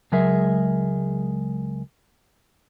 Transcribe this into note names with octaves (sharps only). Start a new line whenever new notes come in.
C#2 F#3 G#3 G#4 A#4 E5